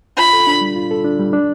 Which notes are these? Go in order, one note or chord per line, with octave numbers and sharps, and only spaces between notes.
F4 B5
A4
D4
G3
F4
A4
D4
G3
D4